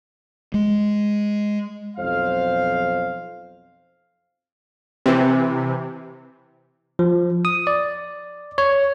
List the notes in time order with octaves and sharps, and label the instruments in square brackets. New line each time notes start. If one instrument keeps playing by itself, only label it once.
[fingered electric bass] G#3
[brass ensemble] B1 F2 C5 F5
[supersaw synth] C3 E3
[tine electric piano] F3
D#6
D5
C#5